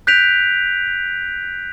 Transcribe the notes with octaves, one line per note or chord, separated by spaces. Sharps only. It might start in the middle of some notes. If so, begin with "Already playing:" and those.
F#6 G6 B6 D7 F7